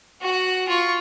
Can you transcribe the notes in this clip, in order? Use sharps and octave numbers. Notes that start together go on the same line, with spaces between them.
F#4 F#5
F4 C#6